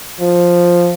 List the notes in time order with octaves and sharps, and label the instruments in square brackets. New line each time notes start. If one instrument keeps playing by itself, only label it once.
[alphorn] F3